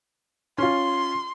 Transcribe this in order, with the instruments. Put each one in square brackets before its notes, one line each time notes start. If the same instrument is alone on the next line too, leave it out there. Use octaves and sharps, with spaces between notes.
[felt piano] C#4 F4 [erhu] C6